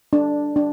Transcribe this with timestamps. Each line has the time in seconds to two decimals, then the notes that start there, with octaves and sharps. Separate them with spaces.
0.13 D4
0.56 D4